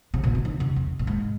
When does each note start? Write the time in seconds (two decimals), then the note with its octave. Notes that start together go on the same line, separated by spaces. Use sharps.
0.14 C3
0.23 A#2
0.35 C3
0.45 D#3
0.60 C3
0.76 F2
0.99 A#2
1.07 G#2